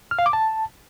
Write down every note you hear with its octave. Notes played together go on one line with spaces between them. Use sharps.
F6
F5
D6
A5